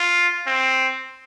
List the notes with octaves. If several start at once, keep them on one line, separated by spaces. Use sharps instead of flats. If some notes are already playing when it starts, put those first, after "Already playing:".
Already playing: F4
C4